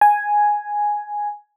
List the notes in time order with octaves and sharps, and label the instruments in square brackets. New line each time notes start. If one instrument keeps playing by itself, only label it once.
[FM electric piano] G#5